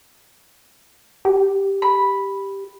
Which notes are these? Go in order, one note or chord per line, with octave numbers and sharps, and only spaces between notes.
G4
B5